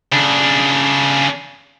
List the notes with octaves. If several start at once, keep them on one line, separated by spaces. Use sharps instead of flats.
C#3 D4